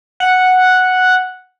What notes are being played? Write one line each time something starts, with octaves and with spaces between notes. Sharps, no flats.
F#5